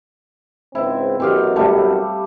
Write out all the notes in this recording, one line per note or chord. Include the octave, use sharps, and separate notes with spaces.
C#2 G#2 C4 E4
A1 F#2 B2 C4 G4 F5
G3 A3